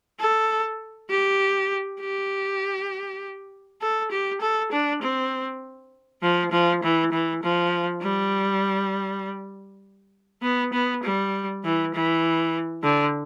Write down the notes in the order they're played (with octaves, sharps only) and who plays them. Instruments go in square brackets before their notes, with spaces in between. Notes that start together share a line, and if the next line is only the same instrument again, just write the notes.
[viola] A4
G4
G4
A4
G4
A4
D4
C4
F3
F3
E3
E3
F3
G3
B3
B3
G3
E3
E3
D3